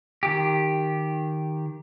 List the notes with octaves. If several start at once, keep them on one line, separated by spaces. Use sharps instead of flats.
D#3 G4